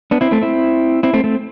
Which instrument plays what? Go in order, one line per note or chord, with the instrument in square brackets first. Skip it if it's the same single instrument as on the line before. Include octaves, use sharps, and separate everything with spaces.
[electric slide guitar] B3 D4
C4 E4
A3 C4
C4 E4
C4 E4
A3 C4
A3 C4